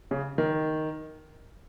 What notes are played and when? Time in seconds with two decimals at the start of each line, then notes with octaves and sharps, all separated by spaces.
0.11 C#3
0.38 D#3